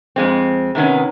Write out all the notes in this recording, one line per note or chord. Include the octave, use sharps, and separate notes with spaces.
F2 G#3 C4
C3 D#3 B3 C#4